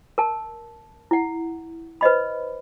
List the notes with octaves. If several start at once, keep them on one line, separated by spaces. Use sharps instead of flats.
A#4 A5
E4 F#5
B4 C5 D#5 B5